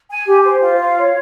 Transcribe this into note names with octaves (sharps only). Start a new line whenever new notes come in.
G#5
G4
C5
F4
F5
C#5